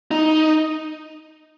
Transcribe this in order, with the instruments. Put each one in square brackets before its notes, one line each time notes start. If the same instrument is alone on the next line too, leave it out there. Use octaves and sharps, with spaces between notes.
[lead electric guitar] D#4